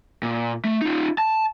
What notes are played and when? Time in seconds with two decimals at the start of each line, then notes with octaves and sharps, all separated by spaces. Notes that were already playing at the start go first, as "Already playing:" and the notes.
0.23 A#2
0.65 A3
0.81 D#4 F4
1.18 A5